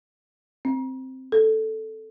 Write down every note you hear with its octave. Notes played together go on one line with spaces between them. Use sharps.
C4
A4